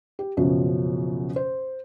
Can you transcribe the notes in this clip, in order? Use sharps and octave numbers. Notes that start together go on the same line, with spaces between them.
G4
F#1 C#2 F#2 B2 F3
C5